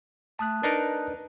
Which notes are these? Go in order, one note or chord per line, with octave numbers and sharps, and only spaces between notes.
A3 A5 D#6 F#6
D4 D#4 A#4 B4